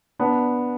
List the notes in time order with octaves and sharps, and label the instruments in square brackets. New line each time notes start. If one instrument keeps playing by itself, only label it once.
[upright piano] B3 D4